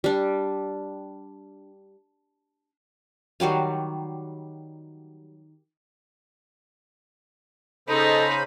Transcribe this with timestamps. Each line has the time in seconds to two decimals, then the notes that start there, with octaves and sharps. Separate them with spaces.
0.04 G3 D4
3.40 D#3 F#3 G3 F5
7.89 C#3 D#4 A4 C5 D#5 B5